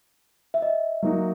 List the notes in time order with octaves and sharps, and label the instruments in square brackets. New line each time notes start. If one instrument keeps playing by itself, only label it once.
[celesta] E5
D#5
[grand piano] F#3 A#3 D#4 F#4